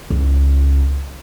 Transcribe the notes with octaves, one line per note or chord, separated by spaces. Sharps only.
C#2